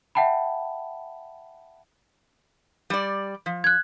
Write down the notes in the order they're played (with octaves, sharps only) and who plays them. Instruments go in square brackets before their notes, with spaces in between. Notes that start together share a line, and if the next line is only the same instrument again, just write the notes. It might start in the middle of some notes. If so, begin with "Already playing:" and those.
[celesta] E5 F#5 G5 A5 B5
[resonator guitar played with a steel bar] G3 D5
F3
[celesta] F#6 G#6